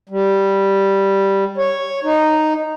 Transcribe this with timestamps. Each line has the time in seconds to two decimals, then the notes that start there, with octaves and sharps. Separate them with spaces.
0.09 G3
1.57 C#5
2.04 D#4